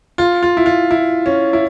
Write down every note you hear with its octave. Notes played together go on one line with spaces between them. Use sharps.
F4
F4
E4
F4
E4
C#4
E4